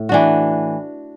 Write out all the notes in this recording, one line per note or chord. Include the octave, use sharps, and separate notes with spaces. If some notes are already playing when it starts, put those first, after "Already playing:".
Already playing: A2
E3 D4 F#4